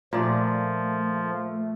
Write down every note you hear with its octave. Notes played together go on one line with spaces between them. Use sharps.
A#2 F3 A3 D5